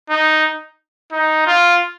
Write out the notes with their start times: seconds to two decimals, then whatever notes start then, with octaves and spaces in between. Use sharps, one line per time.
0.10 D#4
1.12 D#4
1.47 F4